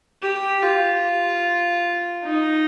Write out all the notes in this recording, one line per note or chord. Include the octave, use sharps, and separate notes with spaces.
G4
F4
D#4